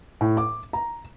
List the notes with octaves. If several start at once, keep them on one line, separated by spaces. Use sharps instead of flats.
A2
D6
A#5